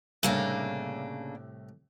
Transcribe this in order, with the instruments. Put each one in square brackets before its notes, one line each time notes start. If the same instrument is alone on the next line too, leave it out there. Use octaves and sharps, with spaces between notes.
[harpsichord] C2 A2 [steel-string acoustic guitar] C#3 A#3 D4